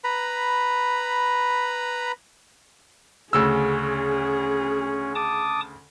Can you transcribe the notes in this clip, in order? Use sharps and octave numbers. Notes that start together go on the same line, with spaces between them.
B4 A#5 B5
D2 C#3 C#4 G#4 E6
A5 D6 D#6